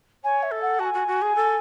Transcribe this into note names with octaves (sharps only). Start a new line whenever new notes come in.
C#5 G#5
E5
A4
F#5
F#4 A5
G#5
F#4
F#4
G#4
A4